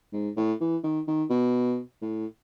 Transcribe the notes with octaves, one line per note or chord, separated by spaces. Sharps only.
G#2
A2
E3
D#3
D#3
B2
A2